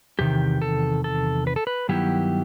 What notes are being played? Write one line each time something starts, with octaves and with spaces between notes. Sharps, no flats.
E2 C3 D#3 G4
A4
A4
B4
A4
B4
G2 D#3 F#3 B3 E4 G4